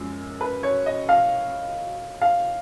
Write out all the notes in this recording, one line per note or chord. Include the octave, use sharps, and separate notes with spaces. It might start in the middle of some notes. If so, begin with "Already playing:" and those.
Already playing: F#2 F3 G#3
B4
C#5
D#5
F5
F5